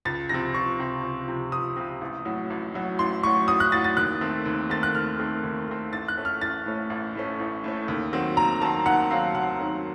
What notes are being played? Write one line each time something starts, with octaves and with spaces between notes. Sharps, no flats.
C#2 A6
C3 F3 C4 A#6
C#2 C#6
C3 F3 C4
C#2
C3 F3 C4
C#2 D#6
C3 F3 C4
A1
A2 F#3
A1
A2 F#3
A1 C6
A2 F#3 C#6
A1 D#6
F#6
A2 F#3 A6
A6
D#2 F#6
D#3 A3 C4
D#2
D#3 A3 C4 A6
F#6
D#2 F6
D#3 A3 C4
D#2
D#3 A3 C4
A1 A6
F#6
A2 A3 C#4
F6
A1 A6
A2 A3 C#4
A1
A2 A3 C#4
A1
A2 A3 C#4
D#2
D#3 F#3 C4
D#2 A#5
D#3 F#3 C4 A5
D#2 F#5
D#3 F#3 C4 F5
D#2 F#5
D#3 F#3 C4